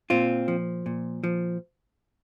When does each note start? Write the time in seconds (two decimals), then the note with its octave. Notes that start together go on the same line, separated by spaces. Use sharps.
0.10 A#2 C4 F4
0.48 F3
0.86 A#2
1.24 F3